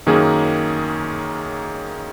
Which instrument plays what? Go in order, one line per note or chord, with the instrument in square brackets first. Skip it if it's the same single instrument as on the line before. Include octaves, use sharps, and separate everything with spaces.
[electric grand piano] F#2 D#3 A#3 C#4 G#4